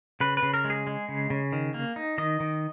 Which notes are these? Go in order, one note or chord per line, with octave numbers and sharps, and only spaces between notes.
C#3 B4
B4
C#3
A#4
G#3
G#4
G#3
C#3
C#3
D#3
A#3
D#4
D#3 D#5
D#3